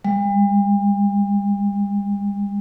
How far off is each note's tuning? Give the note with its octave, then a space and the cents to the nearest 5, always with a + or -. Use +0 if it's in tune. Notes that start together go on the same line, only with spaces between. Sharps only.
G3 +45